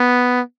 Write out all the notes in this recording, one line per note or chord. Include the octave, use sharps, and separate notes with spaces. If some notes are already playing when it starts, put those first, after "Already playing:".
Already playing: B3